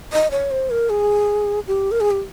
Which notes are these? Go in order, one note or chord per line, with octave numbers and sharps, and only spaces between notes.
D#5
C#5
C5
A#4
G#4
G4
A#4
G#4
G4